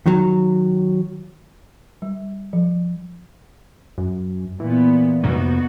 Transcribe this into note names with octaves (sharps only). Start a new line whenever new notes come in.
D#3 F#3
G3
F3
F#2
A#2 E3 B3
F2 C3 A#3 B3 D#4 F#4